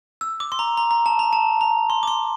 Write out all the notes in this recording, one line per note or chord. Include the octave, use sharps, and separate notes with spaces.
E6
D6
C6
A#5
A#5
A#5
A5
A#5
A5
A#5
C6
D6
C6